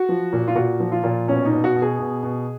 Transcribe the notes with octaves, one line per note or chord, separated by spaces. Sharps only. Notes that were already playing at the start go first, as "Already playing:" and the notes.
Already playing: F#4
F3
A#2
F4
A#2 F#4
F3
F4
A#2
B2 C#4
D#4
B2
F#4
B2
G#4
B2
B2